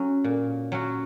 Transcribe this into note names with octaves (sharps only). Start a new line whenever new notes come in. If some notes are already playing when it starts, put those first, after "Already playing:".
Already playing: F#3 C#4 F#4
A#2
F#3 C#4 F#4